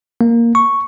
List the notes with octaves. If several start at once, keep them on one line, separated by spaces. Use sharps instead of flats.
A#3
C#6